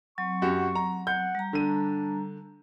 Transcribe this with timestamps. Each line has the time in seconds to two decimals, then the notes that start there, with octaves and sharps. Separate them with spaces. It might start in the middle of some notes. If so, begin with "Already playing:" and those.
0.18 F#3 C4 C#6
0.42 F#2 F#4 G4
0.75 A#5
1.07 F#5 G6
1.35 G3 A#5
1.53 D3 D4 D#7